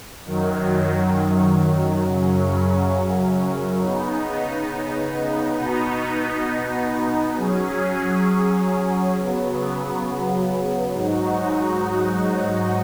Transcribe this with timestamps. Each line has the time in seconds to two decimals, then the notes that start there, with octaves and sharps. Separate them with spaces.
0.25 F#2 D#3 F#3
2.02 F#2 C#3 F#3 C#4
3.79 C#3 B3 D#4
5.57 B2 B3 D#4
7.36 F#3 C#4 G#4
9.14 C#3 F#3 B3
10.91 G#2 F#3 D#4 F#4